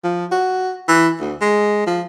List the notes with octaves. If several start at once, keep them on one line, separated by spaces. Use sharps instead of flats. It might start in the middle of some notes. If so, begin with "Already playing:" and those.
F3
F#4
E3
D2
G#3
F3